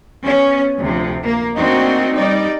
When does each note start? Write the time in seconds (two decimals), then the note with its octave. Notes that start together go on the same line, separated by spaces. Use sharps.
0.23 B3 C#4
0.79 D2 C3 F3
1.23 A#3
1.56 A3 A#3 C4 D4 D#4 F#4
2.13 G3 D#4 D5